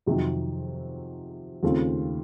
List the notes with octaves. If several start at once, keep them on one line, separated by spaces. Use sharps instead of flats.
F2 C3 D#3 F#3 C4
D#2 C#3 A3 C4 F4